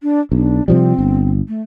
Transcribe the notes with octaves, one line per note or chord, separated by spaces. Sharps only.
D4
B1 D4
C3 F3 G3 C4
G1
A3